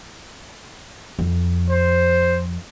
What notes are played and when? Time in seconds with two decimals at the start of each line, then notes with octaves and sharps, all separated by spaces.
1.19 F2
1.70 C5